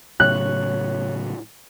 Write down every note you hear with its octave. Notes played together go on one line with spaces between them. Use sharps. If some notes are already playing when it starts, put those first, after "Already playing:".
A2 C#3 F#3 C#5 F#6